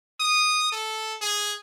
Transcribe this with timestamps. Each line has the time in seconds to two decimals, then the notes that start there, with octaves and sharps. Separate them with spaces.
0.20 D#6
0.72 A4
1.21 G#4